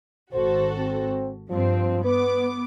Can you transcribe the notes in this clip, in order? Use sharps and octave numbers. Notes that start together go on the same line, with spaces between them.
G#1 F#4 A4 C5
C4
G2 F3 C4
B3 B4 D6